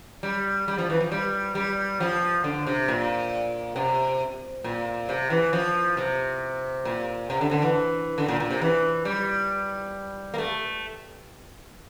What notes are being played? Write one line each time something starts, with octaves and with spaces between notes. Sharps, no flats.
G3
G3
F3
E3
F3
G3
G3
F3
D3
C3
A#2
C3
A#2
C3
E3
F3
C3
A#2
C3
D3
D3
E3
D3
A#2
A#2
C3
E3
G3
A#3
A3